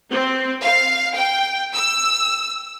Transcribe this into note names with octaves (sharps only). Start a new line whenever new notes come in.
C4
F5
G5
E6